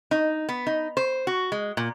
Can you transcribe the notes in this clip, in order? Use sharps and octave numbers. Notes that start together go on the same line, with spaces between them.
D#4
B3
D#4
C5
F#4
G#3
A#2